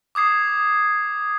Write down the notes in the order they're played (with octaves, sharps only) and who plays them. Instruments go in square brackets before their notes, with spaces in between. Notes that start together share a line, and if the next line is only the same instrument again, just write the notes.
[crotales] D6 D#6 G#6 C7